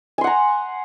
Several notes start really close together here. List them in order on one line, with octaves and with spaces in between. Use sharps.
G#5 C6 F#5 A#5